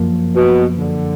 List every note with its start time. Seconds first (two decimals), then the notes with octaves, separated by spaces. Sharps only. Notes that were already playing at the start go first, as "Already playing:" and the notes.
Already playing: F#2 F3 A#3
0.35 B2
0.77 D3